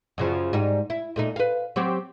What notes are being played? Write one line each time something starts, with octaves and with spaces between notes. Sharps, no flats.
F#2 C#3 F3
G#2 G3 D#4
E4
A#2 A3 D#4
B4 F5
F#3 C4 G4